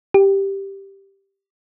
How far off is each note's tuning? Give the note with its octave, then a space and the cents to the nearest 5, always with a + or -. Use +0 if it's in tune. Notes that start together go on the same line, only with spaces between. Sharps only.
G4 +0